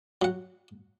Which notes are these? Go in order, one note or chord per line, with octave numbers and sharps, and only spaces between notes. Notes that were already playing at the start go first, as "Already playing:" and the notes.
F#3 F#5